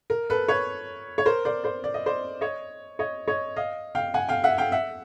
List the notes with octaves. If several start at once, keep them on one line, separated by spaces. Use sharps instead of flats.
A#4
A4 B4
B4 C#5
C#5
A#4 C5
C5 D5
C5 D5
D5
D#5
C5 D5
C#5 D#5
C#5 D#5
C#5 D#5
D#5 F5
F5 G5
F#5 G#5
F5 G5
E5 F#5
F5 G5
E5 F#5